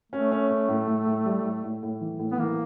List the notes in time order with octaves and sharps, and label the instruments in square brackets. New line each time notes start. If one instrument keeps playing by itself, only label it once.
[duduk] A3 [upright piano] C#4
[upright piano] C#4
C#4
A2
A2
A2
G3
A2
A2
A2
E3
A2
[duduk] B3
[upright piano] E3 [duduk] A#3